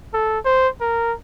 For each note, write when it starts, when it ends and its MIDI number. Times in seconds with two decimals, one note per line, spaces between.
0.14 0.39 69
0.45 0.69 72
0.81 1.14 70